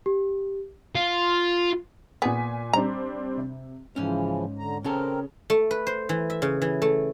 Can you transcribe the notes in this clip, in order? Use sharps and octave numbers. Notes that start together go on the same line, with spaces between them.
G4
F4
A#2 B3 G#4 G#5 B6
G3 C4 D4 A#5
C3
G#2 C#3 E3 F3 C#4
D3 A#5
C#3 C4 C#4 A4 A#4
A3
B4
C5
E3
E5
C#3
E3
A3